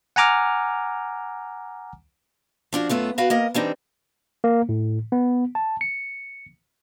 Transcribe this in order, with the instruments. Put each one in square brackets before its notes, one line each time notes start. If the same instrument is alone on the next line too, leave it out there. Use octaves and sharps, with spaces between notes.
[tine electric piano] F#5 G#5 A#5 D6 F6
[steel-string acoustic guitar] F3 D4 F4 F#4
F#2 A3 B3 F4
B3 F#4 B4 F5 G5
A#3 A#4 D#5
E3 G3 C4 D4 D#4
[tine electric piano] A#3
A2
B3
A5
C#7